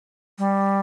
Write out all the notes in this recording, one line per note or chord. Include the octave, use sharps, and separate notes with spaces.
G3